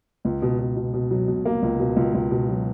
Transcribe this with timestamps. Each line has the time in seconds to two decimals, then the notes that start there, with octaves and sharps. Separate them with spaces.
0.25 C#2
0.42 B2
0.59 B2
0.76 B2
0.93 B2
1.11 F#3
1.28 B2
1.45 A#3
1.62 C#2
1.79 B2
1.96 C#2
2.14 C#2
2.31 B2
2.49 F#3